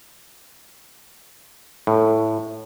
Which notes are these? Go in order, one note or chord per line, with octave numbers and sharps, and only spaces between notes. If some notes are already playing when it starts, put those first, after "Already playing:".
A2